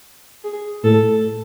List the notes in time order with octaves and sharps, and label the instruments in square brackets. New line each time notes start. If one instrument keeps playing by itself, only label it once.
[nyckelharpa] G#4
[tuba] A2 [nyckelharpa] A4